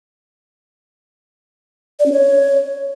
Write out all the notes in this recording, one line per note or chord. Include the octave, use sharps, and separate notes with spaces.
D5
C#4
C#5